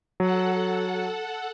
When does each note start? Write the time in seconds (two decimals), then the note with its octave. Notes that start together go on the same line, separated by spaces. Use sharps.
0.20 F#3 A4 F#5